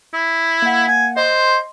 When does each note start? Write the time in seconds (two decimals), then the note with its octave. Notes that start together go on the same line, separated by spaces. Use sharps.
0.14 E4
0.62 A#3 F#5
0.87 G#5
1.16 C5 D#5 C6